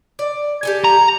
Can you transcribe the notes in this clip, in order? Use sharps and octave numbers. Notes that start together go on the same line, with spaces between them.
D5
G4 A4 G#5
A#5